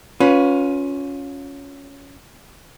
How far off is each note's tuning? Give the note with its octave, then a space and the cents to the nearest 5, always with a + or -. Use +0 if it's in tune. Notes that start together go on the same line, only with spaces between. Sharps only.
C#4 +10 F4 +30 B4 +0